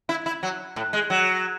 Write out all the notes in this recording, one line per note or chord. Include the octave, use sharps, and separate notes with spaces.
E4
E4
F#3
A2
G#3
F#3